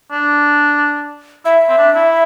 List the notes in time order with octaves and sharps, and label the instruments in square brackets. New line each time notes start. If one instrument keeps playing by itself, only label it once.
[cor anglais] D4
[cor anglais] E4 [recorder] E5
[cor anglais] C4
D4
E4